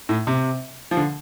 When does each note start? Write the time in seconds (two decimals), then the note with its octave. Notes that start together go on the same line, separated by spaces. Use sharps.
0.09 A2
0.27 C3
0.91 F3
0.97 D3